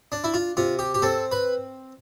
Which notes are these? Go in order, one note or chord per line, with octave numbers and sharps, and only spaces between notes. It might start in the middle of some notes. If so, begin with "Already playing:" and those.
D4
E4
F4
C3 F4
G4
G4
C4 A4
B4